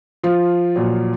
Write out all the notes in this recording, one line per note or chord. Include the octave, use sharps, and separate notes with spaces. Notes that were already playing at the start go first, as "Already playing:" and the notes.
F3 F4
A#2 F#3